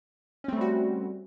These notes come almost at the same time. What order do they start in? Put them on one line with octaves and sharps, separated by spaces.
C#4 C4 A3 G3 F#4